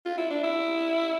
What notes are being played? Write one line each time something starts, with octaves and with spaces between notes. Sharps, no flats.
F4
E4
D4
E4